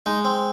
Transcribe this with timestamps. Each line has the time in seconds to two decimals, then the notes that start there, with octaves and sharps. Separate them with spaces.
0.06 G#3 D#4
0.25 C4